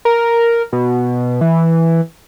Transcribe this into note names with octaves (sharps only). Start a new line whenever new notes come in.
A#4
B2
E3